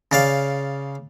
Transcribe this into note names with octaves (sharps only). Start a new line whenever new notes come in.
C#3 D5 F5